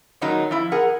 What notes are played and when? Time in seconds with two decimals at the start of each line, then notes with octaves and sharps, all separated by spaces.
0.21 A#2 D#3 F#3 G#3 D#4
0.51 F3 E4
0.72 G#4 A#4 F#5